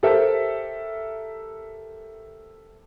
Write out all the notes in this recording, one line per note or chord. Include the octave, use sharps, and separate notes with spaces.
G4 A4 A#4 C5 E5